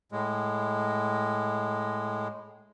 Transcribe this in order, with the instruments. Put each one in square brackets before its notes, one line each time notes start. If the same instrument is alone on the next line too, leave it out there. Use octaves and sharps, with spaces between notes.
[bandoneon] A2 G#3